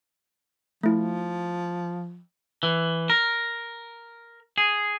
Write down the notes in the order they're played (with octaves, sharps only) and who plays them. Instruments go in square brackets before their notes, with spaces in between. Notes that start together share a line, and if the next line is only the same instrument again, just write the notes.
[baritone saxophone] F3 [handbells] A3 E4
[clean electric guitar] E3
A#4
G#4